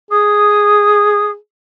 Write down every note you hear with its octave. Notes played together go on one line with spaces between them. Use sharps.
G#4 D#6